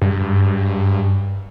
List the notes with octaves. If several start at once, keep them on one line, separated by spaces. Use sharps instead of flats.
G2